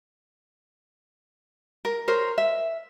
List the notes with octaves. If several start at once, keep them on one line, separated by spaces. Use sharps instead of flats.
A#4
A#4 C5 C#5
E5